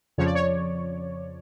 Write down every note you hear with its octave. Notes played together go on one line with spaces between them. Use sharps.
F2 C#3 F3 C#5
D5
C#5